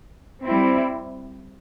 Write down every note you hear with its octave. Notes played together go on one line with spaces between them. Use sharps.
G3 C4 E4